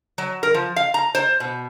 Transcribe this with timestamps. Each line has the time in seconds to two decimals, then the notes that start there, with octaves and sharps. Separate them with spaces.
0.18 F#3
0.43 A#4
0.54 F3
0.76 F5
0.94 A#5
1.15 C5
1.40 B2